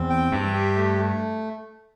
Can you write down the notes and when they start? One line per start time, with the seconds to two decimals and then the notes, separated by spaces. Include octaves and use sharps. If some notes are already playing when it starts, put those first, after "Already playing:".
Already playing: E2 C4
0.10 G5
0.32 G2 E5
0.54 G4
0.76 A3
0.98 A3